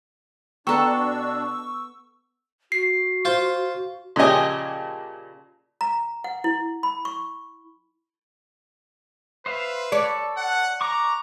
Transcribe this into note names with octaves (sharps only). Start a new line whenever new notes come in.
B2 B3 D4 A4 G5 A#5 C#6 E6
F#4 C7
F4 C5
A#2 C#3 F3 G4 D#5 G#5
A#5
F#5
E4
B5
C#6
B4 C5 E5 F5
A4 C#5 D5
F#5
A#5 C#6 D6 F#6